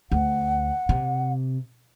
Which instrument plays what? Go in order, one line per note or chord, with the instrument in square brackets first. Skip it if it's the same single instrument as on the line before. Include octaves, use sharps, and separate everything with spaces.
[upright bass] D2 [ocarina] F#5
[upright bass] C3